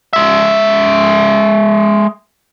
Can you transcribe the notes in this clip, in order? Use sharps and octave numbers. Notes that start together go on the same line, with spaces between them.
G#3 E5